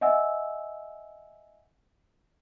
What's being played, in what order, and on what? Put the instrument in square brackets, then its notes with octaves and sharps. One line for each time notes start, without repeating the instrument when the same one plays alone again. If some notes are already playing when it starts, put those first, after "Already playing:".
[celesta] D#5 E5 F#5 G#5 E6